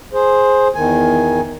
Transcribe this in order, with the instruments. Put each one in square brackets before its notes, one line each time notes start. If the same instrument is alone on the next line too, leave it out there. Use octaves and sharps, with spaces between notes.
[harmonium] G#4 C5
E2 D#3 G#5